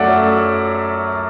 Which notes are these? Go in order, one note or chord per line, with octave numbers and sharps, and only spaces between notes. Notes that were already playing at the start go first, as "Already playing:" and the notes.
Already playing: F#2 F#3 A3 D5 E5 F#5